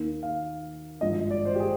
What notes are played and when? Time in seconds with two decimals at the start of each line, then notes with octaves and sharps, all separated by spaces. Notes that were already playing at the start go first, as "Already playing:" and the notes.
Already playing: D#2 D#3 A#3
0.23 F5
1.01 G#1 G2 F3 D#5
1.30 D5
1.45 C5
1.55 G4
1.60 G#4